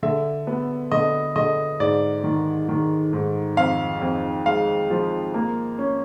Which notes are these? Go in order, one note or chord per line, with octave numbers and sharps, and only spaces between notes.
D3 E5
B3
D3 D#5
D3 D#5
G#2 D5
D#3
D#3
G#2
F2 F5
F2
G#3 F5
F3
A#3
C#4